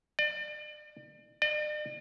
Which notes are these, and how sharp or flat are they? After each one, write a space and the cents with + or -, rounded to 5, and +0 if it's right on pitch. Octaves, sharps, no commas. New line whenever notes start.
D5 +35
D5 +45